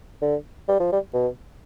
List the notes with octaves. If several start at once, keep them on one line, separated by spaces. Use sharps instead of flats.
D3
G3
F3
G3
B2